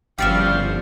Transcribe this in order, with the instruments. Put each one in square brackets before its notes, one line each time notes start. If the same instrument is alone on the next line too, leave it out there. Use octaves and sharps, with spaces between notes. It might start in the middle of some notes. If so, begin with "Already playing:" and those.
[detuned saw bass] G1 [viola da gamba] C#3 F3 G3 [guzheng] G4 D5 E5 [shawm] F5